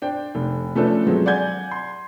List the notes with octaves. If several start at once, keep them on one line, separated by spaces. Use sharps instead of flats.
D4 C5 G5
F1
F3 A3 C#4 D4 A4 B4
F3 F#3 G#3 C4
D5 F#5 G#5 G6 G#6
C6